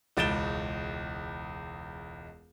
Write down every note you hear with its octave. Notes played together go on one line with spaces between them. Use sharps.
E1 C#2 A6 D7 E7 G7